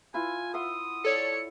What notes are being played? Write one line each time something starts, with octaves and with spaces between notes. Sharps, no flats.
E4 F4 B4 G#5
E5 F#5 C6 D#6
A4 C#5 D5 C#7